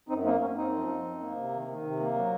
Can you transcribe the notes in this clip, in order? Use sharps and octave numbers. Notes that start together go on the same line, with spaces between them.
F#2 C4 D#4
A#3 C4 D#4
A#3 C#4
F#2 C4 D#4
F3
F#2
F#2
A#3
C3
D#3
D#3
C3
A#3
F#3